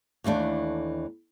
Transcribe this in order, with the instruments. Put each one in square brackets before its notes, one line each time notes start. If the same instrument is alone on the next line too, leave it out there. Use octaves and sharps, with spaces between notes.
[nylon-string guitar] D#2 E3 A3 D4